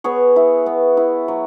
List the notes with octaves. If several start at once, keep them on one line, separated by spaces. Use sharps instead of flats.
B3 G#4 C#5
E4
B3
E4
F#3